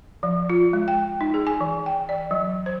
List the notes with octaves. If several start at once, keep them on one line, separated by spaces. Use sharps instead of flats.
F3
F4
G#3
G5
D#4
G#4
G#5
E3
G5
D5
F#3
C5